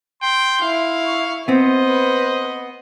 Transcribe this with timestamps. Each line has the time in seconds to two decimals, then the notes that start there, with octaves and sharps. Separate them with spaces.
0.22 G5 C6
0.61 E4 F5
1.06 C#6
1.48 B3 C4 C5 D#5
1.84 B4